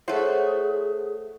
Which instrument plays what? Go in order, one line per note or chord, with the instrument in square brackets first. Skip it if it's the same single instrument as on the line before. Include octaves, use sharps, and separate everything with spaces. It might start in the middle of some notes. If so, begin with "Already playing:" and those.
[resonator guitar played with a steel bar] A3 F#4 [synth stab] E4 C5 C#5 [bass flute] G#4